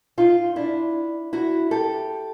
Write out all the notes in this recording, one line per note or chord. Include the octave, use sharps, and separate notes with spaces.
D#4 F4
D4 E4
E4 F#4
G4 A4